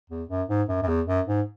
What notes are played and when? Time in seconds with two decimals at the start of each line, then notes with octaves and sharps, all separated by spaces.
0.10 E2
0.29 F#2
0.49 G#2
0.69 F#2
0.83 F#2
0.88 E2
1.07 F#2
1.27 G#2